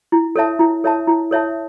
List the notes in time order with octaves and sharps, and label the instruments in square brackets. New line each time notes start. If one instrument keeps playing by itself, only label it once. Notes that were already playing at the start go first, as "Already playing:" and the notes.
[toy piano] E4
A4 C#5 E5 A5
E4
A4 C#5 E5 A5
E4
A4 C#5 E5 A5